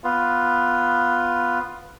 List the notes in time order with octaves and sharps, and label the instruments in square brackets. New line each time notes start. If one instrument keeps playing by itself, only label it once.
[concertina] B3 F4